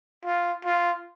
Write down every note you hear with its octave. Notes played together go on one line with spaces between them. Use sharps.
F4
F4